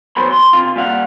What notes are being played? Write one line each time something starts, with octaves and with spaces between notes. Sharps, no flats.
E2 F#3 B3 C5 C#5 B5
C6
C3 F4
A#2 G3 F5 F#5